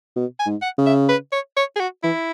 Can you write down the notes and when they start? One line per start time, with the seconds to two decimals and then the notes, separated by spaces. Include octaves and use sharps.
0.16 B2
0.40 G#5
0.46 G#2
0.62 F#5
0.78 C#3
0.86 E5
1.09 B4
1.32 C#5
1.57 C#5
1.76 G#4
1.80 F#4
2.03 E3 E4